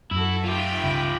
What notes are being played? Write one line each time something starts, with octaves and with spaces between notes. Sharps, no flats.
F#2 E4 F#4 A4
F4 G4 E5 G5 B5
C#2 G2 C#3